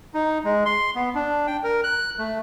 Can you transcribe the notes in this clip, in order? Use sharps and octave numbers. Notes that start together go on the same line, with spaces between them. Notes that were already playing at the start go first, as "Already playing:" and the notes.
D#4
G#3
C6
B3
D4
G5
A#4
F#6
A3